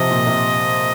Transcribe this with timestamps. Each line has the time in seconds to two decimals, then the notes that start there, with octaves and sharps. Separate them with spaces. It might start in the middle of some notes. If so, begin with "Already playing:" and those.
Already playing: C3 F3 D#5
0.11 A#2
0.27 C3